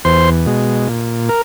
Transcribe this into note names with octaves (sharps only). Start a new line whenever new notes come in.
E2 C5 C6
B2 G#3
A#2
A#4